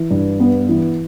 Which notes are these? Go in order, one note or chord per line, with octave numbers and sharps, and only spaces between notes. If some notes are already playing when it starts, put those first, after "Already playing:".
Already playing: E3
G2
B3
E3